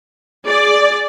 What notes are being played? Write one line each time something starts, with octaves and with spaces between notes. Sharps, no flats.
G#4 D5